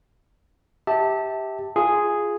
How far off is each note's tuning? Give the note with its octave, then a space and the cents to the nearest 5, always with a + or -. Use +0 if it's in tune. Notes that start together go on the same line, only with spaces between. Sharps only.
G4 +0 E5 -30 A5 +10
F4 +0 G#4 +0